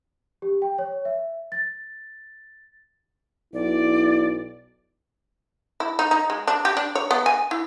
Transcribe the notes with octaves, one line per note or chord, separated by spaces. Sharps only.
G4
G5
C#5
E5
A6
B1 E4 D5
E4
D#4
D#4
G#3
D4
G4
D4
C#5
B3
G#5
E4